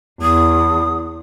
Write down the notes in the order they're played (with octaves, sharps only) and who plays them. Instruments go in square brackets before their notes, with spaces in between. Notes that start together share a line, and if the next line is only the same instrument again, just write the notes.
[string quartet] E2 [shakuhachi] D#6